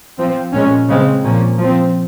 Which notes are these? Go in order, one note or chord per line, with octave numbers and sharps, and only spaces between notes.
F3 C4
A#2 G#3 C#4
C#3 G#3 C4
A#2 F3 A#3 C#4
F3 C4